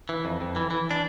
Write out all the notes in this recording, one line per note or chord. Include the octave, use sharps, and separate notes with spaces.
E3
F2
F2
E3
E3
D4